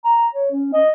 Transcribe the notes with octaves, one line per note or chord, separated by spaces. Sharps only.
A#5
C#5
C#4
D#5